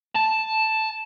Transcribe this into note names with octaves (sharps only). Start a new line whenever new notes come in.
A5